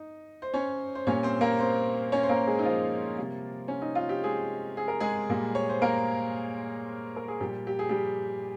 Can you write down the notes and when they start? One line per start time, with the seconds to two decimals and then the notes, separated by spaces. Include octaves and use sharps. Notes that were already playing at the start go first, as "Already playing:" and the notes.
Already playing: D#4
0.42 C5
0.54 C#4 C#5
0.95 C5
1.07 A#2 G3 A#3 C#4 C#5
1.23 C4 C5
1.41 A#3 A#4
1.60 C4 C5
2.12 C#4 C#5
2.23 C5
2.29 A#3 A#4
2.47 G#3 G#4
2.59 D#4
2.64 F3 F4
3.17 C3 G3 A#3
3.68 C#4
3.82 D#4
3.95 F4
4.09 G4
4.23 G#3 G#4
4.77 G#4
4.88 A#4
5.00 G#3 G#4
5.29 A#2 G3 A#3
5.55 C#5
5.69 C5
5.82 A#3 A#4
7.16 A#4
7.28 G#4
7.40 A#2 F3 G3 A#3 G4
7.67 G4
7.79 G#4
7.89 G3 G4